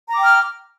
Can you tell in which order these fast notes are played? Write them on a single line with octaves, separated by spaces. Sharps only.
A#5 D6 G5 F6